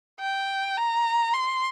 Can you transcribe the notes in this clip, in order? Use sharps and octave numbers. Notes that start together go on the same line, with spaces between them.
G5
A#5
C6